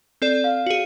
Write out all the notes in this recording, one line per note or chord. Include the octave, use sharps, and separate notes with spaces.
C4 A4 D5
F5
F#4 G#4